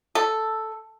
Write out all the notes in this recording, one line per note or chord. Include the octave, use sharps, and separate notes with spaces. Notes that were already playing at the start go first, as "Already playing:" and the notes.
A4